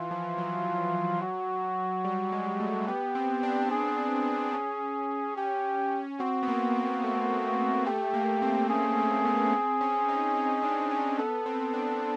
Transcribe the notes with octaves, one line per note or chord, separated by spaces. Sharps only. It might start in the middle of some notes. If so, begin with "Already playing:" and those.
Already playing: E3 F4
F3
F#3
F#4
G3
G#3
A3
B3 G4
C4
D4
G#4
C#4
C#4 G4
C4 F#4
B3
A#3
A#3
A3
A3 G4
A#3
C4
C#4 G#4
C4
B3
C#4
C4
C#4
D#4
D#4
D4
C#4
B3 A4
C4
D4